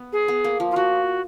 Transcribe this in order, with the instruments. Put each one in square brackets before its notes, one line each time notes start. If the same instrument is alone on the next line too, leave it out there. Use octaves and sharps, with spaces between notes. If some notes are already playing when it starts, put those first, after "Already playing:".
Already playing: [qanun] B3
[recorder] G#4
[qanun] B3
A#3
F3
[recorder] F4
[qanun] F3 [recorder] F#4